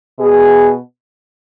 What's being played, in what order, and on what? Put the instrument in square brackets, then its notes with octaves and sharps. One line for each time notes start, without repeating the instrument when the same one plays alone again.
[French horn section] B2 B3 G#4